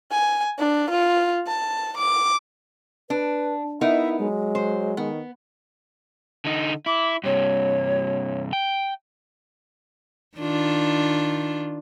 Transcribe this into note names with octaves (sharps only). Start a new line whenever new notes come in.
G#5
D4
F4
A5
D6
D4 B4
B3 D#4 E4 A#4 E5
F#3 G#3
C5
D#3 B3
D3 D#4
E4 D6
G2 C3 C#5
G5
D#3 D4 F4